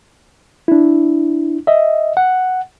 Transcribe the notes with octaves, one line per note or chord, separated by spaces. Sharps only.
D4 E4
D#5 E5
F#5